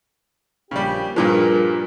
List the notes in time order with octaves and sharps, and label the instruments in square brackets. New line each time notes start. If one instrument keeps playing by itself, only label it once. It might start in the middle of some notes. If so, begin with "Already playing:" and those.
[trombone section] A#1 F3 G4 [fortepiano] C#3 G3
[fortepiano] G2 A#2 F3 [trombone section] G3 G#4 A#4